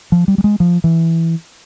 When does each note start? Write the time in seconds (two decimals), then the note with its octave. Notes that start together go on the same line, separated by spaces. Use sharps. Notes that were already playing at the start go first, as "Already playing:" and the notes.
0.12 F3
0.28 G3
0.38 G3
0.44 G#3
0.60 F3
0.84 E3